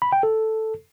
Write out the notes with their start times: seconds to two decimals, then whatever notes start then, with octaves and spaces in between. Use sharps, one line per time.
0.02 B5
0.12 G5
0.23 A4